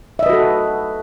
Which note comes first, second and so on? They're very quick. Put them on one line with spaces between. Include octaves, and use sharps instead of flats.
E5 D#5 B4 F#4 A4